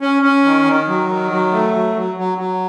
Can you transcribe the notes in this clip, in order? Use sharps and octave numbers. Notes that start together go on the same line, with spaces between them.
C#4
C#4
D#3
D#3
F#3
D#3
F#3
A3
F#3
F#3
F#3
F#3